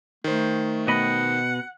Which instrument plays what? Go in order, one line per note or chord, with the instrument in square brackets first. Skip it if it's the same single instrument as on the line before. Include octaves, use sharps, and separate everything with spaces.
[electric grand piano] D#3 C5 [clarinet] A3
[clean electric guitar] B2 D#5 B5 [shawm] F#5